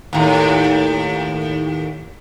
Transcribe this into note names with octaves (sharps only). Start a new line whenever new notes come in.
D#2 A2